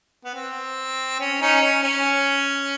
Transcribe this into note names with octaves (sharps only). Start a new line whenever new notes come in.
B3
C4
C#4
C#4 D#4
C#4
C#4